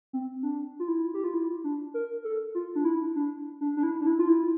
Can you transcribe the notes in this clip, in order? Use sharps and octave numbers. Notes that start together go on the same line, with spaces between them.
C4
D4
F4
E4
G4
F4
E4
D4
A#4
A4
F4
D4
E4
D4
D4
D4
E4
D4
E4
F4
E4